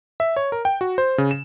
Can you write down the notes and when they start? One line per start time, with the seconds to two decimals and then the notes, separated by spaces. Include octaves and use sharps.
0.20 E5
0.37 C#5
0.52 A#4
0.65 G5
0.81 F#4
0.98 C5
1.18 C#3
1.31 E7